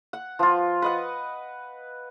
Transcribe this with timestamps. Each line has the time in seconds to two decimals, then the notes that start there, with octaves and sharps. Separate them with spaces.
0.13 F#5
0.39 F3 F4
0.82 B4 D#5 F#5